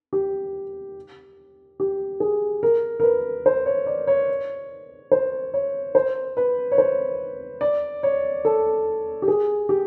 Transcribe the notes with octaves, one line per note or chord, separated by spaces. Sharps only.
G4
G4
G#4
A#4
A#4
B4
C5
C#5
D5
C#5
C5
C#5
C5
B4
C#5
C5
D5
C#5
A4
G4
G#4
G4